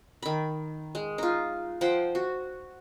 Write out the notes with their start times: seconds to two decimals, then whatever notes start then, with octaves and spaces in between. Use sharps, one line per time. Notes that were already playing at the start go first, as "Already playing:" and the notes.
0.22 D#3 B5
0.95 G#3
1.18 D#4 F4
1.81 F3 C5 F#5 G5
2.15 F#4